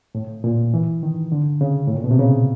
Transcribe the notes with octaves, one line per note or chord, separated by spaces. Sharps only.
A2
A#2
E3
D#3
D3
C#3
A2
A#2
B2
C3
C#3